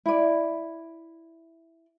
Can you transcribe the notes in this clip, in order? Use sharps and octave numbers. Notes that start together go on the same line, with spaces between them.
E4 D5